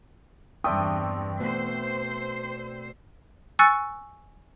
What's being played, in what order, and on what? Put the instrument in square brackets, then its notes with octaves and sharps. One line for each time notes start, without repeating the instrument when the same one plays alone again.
[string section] E2 G2 [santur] C4 D4 E5 [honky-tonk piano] G5 C#6 D#6
[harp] B2 A3 [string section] C5
[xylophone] G#5 C#6 E6 F#6 A6 C#7